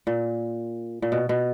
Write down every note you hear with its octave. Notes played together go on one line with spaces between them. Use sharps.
A#2
A#2
B2
B2